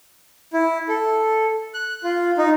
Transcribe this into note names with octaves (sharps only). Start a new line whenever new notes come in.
E4
A4
F#6
F4
D#4